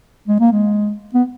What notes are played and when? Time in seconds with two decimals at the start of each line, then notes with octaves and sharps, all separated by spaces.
0.28 G#3
0.40 A#3
0.52 G#3
1.14 B3